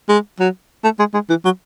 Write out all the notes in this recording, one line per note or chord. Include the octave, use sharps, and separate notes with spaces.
G#3
F#3
A3
G#3
G#3
E3
F#3